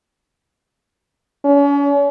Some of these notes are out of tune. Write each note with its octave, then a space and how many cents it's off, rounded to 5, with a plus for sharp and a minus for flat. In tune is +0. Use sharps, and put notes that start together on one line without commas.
C#4 +40